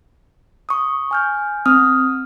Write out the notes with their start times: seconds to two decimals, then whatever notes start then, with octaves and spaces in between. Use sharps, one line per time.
0.69 C#6 D#6
1.11 G#5 F6 G6
1.66 C4 D#6 F6